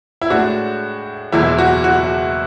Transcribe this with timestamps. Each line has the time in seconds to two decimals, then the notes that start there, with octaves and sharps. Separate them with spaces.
0.22 E4
0.30 A2 G#3 D4 F#4
1.32 F#1 E2 B2 G#3 E4
1.58 F#4
1.84 F#4